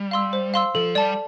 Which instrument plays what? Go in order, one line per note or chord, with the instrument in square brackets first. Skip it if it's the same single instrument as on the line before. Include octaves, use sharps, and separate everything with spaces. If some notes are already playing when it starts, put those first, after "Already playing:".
Already playing: [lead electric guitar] G3
[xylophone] F5 C6 E6
C5
F5 C6 E6
[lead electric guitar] F3 [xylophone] A4
[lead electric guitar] G3 [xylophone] D5 A5